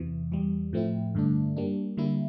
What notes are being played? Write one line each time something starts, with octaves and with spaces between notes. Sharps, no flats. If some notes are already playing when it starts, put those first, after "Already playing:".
Already playing: E2 C3 E3
E2 E3 G3
A2 F3 A3 C4 E4
G2 D3 A3 D4
G3 A#3 D4
D3 G3 A#3 E4